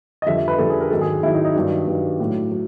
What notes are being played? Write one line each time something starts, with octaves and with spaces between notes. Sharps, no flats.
D#5
F2 D3 G3 E5
E5
B4
F2 D3 G3 A4
G#4
A#4
G#2 D#3 F#3 A4
G#4
G#2 D#3 F#3 E4
D#4
D#4
G2 D#3 F#3 D4
G2 D#3 F#3
A2 F#3
F#3